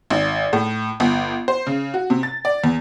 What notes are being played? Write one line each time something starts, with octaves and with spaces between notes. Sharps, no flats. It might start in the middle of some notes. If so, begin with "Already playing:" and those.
G#1
A2
G1
C5
C#3
F#4
C3
A6
D5
E2